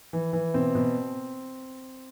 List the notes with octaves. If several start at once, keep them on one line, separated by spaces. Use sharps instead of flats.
E3
E3
B2 C4
B2